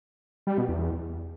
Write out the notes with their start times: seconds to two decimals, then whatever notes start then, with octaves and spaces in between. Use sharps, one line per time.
0.47 G3
0.58 B2
0.69 E2